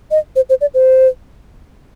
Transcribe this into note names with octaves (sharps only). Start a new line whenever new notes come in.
D#5
C5
C5
D5
C5